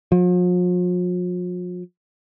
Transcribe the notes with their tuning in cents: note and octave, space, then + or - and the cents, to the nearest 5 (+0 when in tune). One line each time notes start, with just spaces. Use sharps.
F3 +45